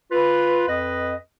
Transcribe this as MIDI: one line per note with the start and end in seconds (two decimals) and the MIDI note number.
0.12 0.67 65
0.12 0.67 71
0.68 1.13 41
0.68 1.13 71
0.68 1.13 75